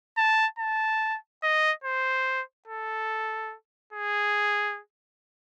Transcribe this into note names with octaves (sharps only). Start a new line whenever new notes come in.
A5
A5
D#5
C5
A4
G#4